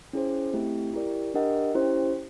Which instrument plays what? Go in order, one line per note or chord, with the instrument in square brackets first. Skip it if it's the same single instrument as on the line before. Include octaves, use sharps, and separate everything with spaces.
[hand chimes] C#4 E4 G#4 C5
A3 C4 E4 G4
E4 G4 A#4 D5
D4 G4 A#4 D#5 F#5
C#4 E4 G4 C5